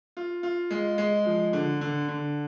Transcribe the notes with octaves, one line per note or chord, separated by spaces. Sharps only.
F4
F4
G#3
G#3
F3
D3
D3
D3